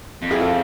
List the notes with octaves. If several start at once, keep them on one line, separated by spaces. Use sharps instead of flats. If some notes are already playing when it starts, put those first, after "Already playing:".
F2
E4 G#4
F4 A4